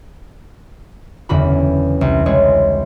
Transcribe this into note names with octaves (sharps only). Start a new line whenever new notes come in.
F#1 E2 D3 F#4 B5
C2
C2 G#3 C#5